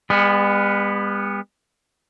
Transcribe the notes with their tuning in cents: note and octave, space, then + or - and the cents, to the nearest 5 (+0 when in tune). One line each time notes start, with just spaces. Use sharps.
G3 +45 B3 +0 G#4 +0